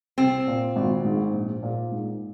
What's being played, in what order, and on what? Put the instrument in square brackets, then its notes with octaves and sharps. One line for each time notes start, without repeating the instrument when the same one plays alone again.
[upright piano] C2 [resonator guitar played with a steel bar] C4
[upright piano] A#2
G#1
G#2
A#1
A#2
G#2